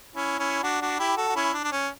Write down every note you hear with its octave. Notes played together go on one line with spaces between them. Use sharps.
C#4 E4
C#4 E4
D4 F#4
D4 F#4
E4 G4
F#4 A4
F#4
C#4 E4
D4
D4
C#4